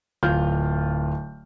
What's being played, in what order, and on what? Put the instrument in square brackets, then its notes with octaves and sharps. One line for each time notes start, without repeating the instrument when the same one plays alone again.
[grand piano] D1 F4 F6 G6